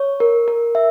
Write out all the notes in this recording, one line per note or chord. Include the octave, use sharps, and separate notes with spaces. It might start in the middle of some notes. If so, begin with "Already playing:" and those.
Already playing: C#5
A#4
A#4
E5